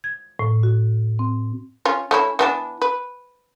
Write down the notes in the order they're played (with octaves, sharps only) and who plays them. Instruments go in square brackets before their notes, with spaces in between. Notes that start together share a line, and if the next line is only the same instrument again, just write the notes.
[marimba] G#6
A2
F#4
C4
[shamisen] C#4 F4
A3 C#4 E4
E3 B3 D4
B4